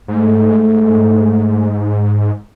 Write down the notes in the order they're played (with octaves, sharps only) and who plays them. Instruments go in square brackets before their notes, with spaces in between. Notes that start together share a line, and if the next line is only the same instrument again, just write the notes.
[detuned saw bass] G#2 [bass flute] A3